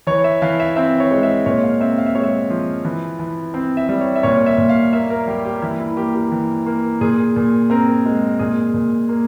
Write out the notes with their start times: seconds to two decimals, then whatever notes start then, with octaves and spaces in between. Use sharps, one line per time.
0.07 E3 C#5
0.24 E5
0.42 E3 F5
0.60 E5
0.76 C4 E5
1.00 C#5
1.11 G#3
1.23 E5
1.46 A#2 C#5
1.63 F5
1.81 C4 E5
1.98 F5
2.06 E5
2.15 G#3 C#5
2.23 E5
2.50 F3
2.85 E3
3.19 E3
3.54 C4
3.77 E5
3.89 G3
4.01 C#5
4.16 E5
4.23 A#2 C#5
4.46 E5
4.58 A#2
4.69 F5
4.93 A#3 E5
5.10 A#4
5.27 G3 G4
5.45 G4
5.62 E3 E4
5.80 E4
5.97 A#3 G4
6.15 G4
6.32 E3
6.66 A#3
7.01 A#2 G#4
7.36 A#2
7.70 C4 A#4
8.05 G#3
8.39 A#2 G#4
8.74 A#2
9.09 A#3